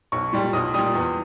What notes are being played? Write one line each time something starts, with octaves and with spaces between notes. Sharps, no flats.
B1 C#6
A#2 G3
B1 D#6
A#2 G3 D#6
E2